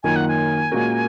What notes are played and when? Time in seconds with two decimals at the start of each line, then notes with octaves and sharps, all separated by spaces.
0.03 F#2 D#3 A#3 F4 A#4 G#5
0.16 F#5
0.28 G#5
0.72 A#2 G#3 C#4 F#4 A#4